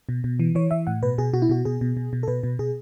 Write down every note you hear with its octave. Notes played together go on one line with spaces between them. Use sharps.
B2
B2
E3
E3 C#5
E3 E5
A2 F#5
B2 B4
B2 G#4
B2 F#4
E4
B2 F#4
B2 G#4
B2
B2
B2
A4
B2 B4
B2
B2 G#4